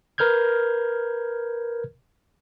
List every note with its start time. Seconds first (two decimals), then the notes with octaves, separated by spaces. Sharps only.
0.18 A#4 B4 F6 G6 G#6